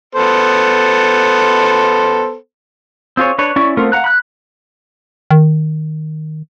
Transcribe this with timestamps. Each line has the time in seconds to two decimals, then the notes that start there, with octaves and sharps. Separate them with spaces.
0.15 B3 A4 C5
3.17 C4 F4 G#4 C#5
3.39 D4 B4 C#5
3.56 C#4 E4 D5 C#6
3.77 A3 B3 C4 F4 A#4
3.92 F5 F#5 A#5 F#6
4.04 B5 F#6
5.31 D#3